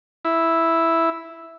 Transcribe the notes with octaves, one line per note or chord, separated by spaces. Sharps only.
E4